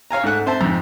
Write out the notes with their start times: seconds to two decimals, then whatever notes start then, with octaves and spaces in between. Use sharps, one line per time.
0.11 C#5 F5 G#5 A#5
0.24 G#2 A3 F#5 F#6
0.46 C4 C5 E5 A5
0.61 F2 G#2